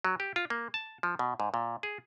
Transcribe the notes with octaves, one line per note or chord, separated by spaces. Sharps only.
F#3
G4
F4
A#3
A5
F3
B2
G#2
A#2
G#4